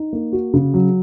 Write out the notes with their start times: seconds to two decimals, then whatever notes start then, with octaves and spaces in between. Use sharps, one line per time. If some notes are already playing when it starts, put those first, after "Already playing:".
Already playing: D#4
0.13 A#3
0.33 F#4
0.54 C#3
0.74 F#3